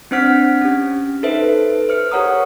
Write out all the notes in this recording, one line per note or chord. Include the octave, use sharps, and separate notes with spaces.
C4 D4 C5 F#5 F6 B6
C#4 G4
D#4 A4 B4 C5 E5
C5 F6 C#7
G4 A#4 C#5 F#5 A#5 D#6